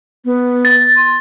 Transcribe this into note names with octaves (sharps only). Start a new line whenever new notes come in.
B3
A6
C6